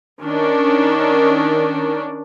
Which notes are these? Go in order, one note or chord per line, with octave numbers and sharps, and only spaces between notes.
D#3 C#4 D4